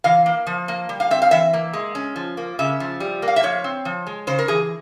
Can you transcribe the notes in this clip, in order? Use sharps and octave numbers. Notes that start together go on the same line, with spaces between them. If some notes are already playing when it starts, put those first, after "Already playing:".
E3 F5
A#3
F3
A#3
G3
F5
C4 E5
F5
E3 E5
A#3
G#3
C#4
F3
A#3
C#3 E5
F3
G3
A#3
F5
E5
F3 C#5
C4
F3
G#3
C#3 C5
A#4
E3 G#4